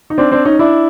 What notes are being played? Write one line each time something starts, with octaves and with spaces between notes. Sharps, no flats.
D#4
C4 D4
C4 D4
C#4 D#4
D4 E4